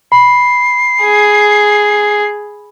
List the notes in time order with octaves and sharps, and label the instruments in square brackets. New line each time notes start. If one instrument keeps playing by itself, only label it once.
[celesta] B5 [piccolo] C7
[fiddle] G#4